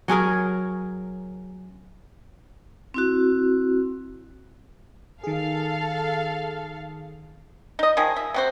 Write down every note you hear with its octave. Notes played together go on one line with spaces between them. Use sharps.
F#3 C#4 G#4 A#4
C4 E4 F#4
D#3 G#4 A4 F5
D#4 D#5
D#3 F3 G#4
E5
C3 F#4 C5